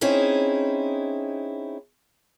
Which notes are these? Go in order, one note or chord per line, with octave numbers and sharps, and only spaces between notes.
C4 C#4 D#4 E4 G#4